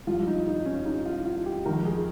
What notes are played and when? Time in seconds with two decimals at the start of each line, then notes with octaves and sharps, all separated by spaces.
0.07 G2 F3 F4
0.27 D#4
0.47 D#4
0.66 C#4
0.85 D#4
1.05 F4
1.25 F4
1.46 G4
1.66 F2 D#3 A#4
1.85 G#4